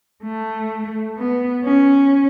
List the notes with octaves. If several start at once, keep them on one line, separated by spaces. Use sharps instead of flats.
A3
B3
C#4